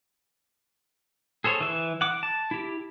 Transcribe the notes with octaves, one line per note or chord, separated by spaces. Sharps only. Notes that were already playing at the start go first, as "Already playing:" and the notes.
G#4 A4 C5 C#5
E3 E5
F#5 D6
A5
E4 G4